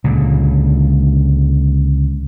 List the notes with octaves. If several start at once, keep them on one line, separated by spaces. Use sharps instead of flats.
C#2 A#2 D3